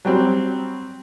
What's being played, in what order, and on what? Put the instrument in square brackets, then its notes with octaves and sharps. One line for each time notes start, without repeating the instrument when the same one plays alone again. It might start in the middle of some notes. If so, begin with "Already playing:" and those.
[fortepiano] F#3 G3 C4